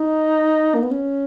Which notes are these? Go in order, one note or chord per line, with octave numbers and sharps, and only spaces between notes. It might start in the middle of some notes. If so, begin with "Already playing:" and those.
Already playing: D#4
A#3
B3
C#4